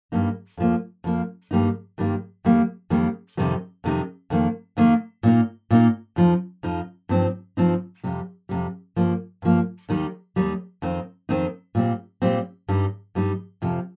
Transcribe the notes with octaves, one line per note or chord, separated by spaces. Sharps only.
G2 G3 A#3 D#4
F2 F3 A#3
F2 F3 A#3
G2 D#3 G3 A#3 D#4
G2 D#3 G3 A#3 D#4
F2 D#3 G3 A#3
F2 D#3 G3 A#3
F2 C3 D#3 G3 D#4
F2 C3 D#3 G3 D#4
F2 D#3 A#3
F2 D#3 A#3
A#2 A#3 D#4
A#2 A#3 D#4
F2 F3 D#4
F2 F3 D#4
G2 F3 C4 D#4
G2 F3 C4 D#4
F2 C3 G3
F2 C3 G3
G2 F3 A#3
G2 F3 A#3
D#2 D#3 G3 D#4
D#2 D#3 G3 D#4
F2 D#3 C4 D#4
F2 D#3 C4 D#4
A#2 G3 C4
A#2 G3 C4
G2 G3 D#4
G2 G3 D#4
F2 C3 F3